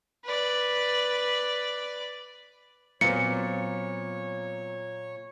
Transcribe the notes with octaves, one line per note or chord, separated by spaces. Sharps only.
B4 D5
A#2 F#3 B3 C4 C#5 C#7